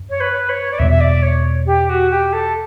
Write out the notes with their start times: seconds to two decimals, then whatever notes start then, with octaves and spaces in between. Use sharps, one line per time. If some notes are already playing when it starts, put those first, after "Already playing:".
Already playing: F#2
0.10 C#5
0.20 B4
0.49 C#5
0.72 D5
0.79 E2 B2 G3 E5
0.91 E5
1.01 D5
1.23 C#5
1.66 G4
1.89 F#4
2.11 G4
2.33 A4